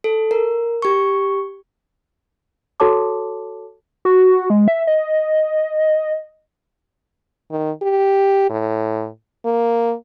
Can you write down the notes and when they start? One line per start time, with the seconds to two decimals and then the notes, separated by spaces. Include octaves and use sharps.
0.04 A4
0.31 A#4
0.82 G4 C#6
2.80 F#4 A4 C#5 A5 D6
4.05 F#4
4.50 G#3
4.68 E5
4.87 D#5
7.51 D#3
7.82 G4
8.50 A2
9.45 A#3